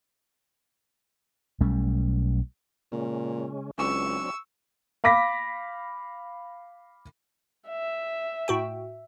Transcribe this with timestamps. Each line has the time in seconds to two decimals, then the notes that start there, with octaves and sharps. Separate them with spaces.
1.61 B1 G3 A3 C#4
2.92 A#2 C#3 G#3 C#4
3.78 C#2 F#3 C4 D4 C#6 E6
5.04 F5 B5 D6 A#6 B6
7.69 E5
8.48 A2 F#4 G5